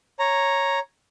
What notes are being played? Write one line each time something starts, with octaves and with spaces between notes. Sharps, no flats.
C#5 A#5